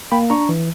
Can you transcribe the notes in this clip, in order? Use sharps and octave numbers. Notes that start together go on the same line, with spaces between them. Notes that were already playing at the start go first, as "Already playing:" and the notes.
A#3 G5 B5
D4 A#5 C#6
E3